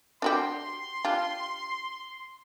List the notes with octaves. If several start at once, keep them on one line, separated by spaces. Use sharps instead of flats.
D4 F#4 G4 C6
D4 F4 G4